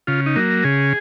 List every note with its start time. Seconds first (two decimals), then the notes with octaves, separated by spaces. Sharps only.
0.07 C#3 F4
0.26 D#4
0.36 F#3 A#3
0.64 C#3 G#4